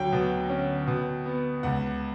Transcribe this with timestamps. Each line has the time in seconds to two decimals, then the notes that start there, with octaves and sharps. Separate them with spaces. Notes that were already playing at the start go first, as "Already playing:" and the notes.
Already playing: D2 F#3 G5
0.12 B2
0.50 C#4
0.87 B2
1.26 B3
1.63 C#2 F#5